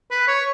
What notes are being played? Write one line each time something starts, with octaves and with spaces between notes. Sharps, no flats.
B4
C#5